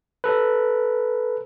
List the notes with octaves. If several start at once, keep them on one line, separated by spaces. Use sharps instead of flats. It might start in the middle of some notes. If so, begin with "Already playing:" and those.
A4 B4